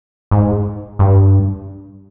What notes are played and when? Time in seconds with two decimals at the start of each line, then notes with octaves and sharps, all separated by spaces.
0.31 G#2
0.99 G2